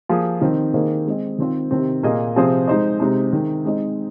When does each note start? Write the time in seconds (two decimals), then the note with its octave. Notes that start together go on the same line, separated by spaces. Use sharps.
0.09 F3 A#3 G#4
0.41 D#3 C4 D#4
0.74 D#3 A#3 G#4 C5 D#5
1.06 G#3 C4 G#4 D#5
1.38 D#3 C4 F4 C5
1.71 C3 D#3 C4
2.03 A#2 A#3 G#4 D#5
2.36 C3 F3 C4 G#4 C5
2.68 G#3 D#4 C5 D#5
3.00 C3 G#3 C4 D#4
3.32 D#3 C4 G#4
3.65 G#3 C4 D#4 C5 D#5